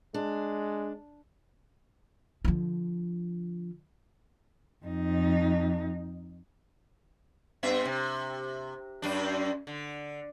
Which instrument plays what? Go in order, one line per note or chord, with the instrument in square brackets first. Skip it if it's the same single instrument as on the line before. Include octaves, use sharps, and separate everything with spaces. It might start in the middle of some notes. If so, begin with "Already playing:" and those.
[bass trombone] G#3 [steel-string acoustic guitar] D4
[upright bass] D3 F3
[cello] F2 D#4
[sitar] G2 B3 E5
C3
F#2 D4
D3